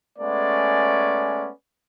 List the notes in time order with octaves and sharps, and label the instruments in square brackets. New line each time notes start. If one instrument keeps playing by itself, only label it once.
[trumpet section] G#3 A3 B3 C#4 D5